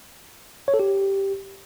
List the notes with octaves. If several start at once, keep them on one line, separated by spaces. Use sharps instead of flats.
C#5
A4
G4